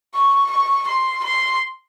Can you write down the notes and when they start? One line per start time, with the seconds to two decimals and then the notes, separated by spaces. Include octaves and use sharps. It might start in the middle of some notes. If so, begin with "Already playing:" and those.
0.15 C#6
0.51 C#6
0.88 C6
1.24 C6